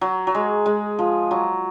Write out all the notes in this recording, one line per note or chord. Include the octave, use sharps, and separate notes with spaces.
F#3
F#3
G#3
G#3
F3
F#3